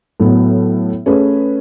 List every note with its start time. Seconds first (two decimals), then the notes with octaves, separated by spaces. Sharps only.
0.20 A2 F#3 B3
1.06 A3 C#4 G#4 B4